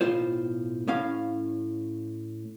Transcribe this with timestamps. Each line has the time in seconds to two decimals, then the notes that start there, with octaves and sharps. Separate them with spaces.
0.01 B1 A2 F4 C5
0.88 A2 C#4 F5